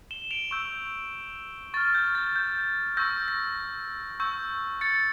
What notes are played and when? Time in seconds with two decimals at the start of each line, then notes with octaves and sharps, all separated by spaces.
0.11 E7 G7
0.31 D7 F7
0.51 C#6 E6 G6
1.74 C#6 F6 A6
1.94 G6
2.15 A6
2.36 G6
2.97 C#6 E6 G6 A#6
3.28 A#6
4.20 C#6 E6 G6
4.81 A6 C#7